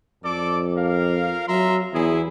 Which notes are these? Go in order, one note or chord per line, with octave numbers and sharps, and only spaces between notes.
F2 A4 D5 D6
A#4 F5
F#3 E5 A#5 C6
E2 E4 G#4